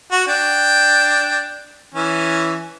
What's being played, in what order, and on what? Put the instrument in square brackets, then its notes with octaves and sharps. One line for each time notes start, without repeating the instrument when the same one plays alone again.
[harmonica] F#4
D4 G5
E3 C#4